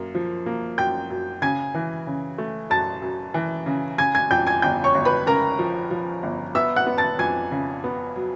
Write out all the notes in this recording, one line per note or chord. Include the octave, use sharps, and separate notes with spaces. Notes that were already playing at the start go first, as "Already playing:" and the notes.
Already playing: F#2 A#3
F3
A#3
F#2 G5 G6
F#2
C#3 G#5 G#6
E3
C#3
A3
F#2 A5 A6
F#2
E3
C#3
C#3 G#5 G#6
G#5 G#6
F2 G5 G6
G#5 G#6
G1 G5 G6
C#5 C#6
G1
B4 B5
C#3 A#4 A#5
F3
F3
G1
B3 E5 E6
F#5 F#6
B3
A5 A6
F2 G#5 G#6
C#3
B3
F#3